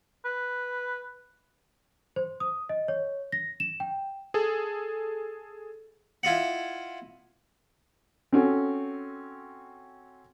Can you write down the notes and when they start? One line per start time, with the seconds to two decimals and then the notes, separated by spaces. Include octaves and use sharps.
0.25 B4
2.16 C5
2.40 D#6
2.69 D#5
2.88 C#5
3.32 A#6
3.60 E7
3.80 G5
4.34 G#4 A4
6.23 E4 F4 D#5 F#5
8.33 C4 C#4 F#4 A4